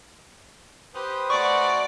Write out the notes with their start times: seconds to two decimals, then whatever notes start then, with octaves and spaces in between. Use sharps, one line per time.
0.95 G4 B4 C5 D#6
1.30 A3 F#4 D5 C#6